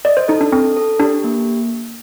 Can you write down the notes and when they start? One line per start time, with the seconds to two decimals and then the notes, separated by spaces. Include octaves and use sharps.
0.05 D5 D#5
0.17 C5
0.28 D#4 A4
0.41 D4
0.52 C4 A4
0.77 A4
1.00 D4 G4
1.24 A#3